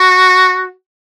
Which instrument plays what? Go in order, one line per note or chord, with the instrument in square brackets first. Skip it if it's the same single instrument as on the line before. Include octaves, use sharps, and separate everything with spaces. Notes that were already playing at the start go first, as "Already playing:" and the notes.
Already playing: [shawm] F#4